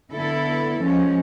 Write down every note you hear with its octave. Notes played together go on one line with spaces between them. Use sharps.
D3 B3 E4 A4
F3 G#3 C#4